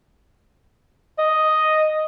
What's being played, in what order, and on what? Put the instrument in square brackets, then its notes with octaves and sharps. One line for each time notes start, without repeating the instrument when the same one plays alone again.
[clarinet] D#5